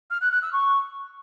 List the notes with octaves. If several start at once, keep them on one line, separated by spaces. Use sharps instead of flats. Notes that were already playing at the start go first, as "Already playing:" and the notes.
F6
F#6
F#6
E6
C#6